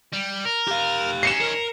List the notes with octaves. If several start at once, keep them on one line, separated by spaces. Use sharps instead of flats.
G3
A#4
G4 F5
C#4 D#4 C7 C#7 E7
A#4